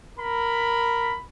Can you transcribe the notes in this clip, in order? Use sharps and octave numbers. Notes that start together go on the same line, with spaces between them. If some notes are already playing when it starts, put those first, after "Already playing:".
A#4 B5